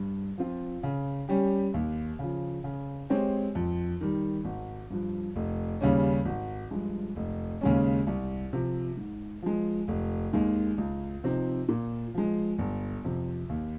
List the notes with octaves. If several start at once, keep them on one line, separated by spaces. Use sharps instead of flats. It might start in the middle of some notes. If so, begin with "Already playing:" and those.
Already playing: G2
F3 C4 F4
C#3
G3 C#4 G4
D#2
C#3 F3
C#3
G#3 C4 G4 C#5
F2
D#3 G3
G#1
G2 F3
F1
D#2 C#3 G3 C#4
G#1
G2 F3 G#3
F1
D#2 C#3 G#3 C#4
C2
C3 F3
G#2
F3 G#3
F1
D#2 D#3 G#3
C#2
C3 F3 C4 D#4
A#2
F3 G#3
G1
F2 C3
D#2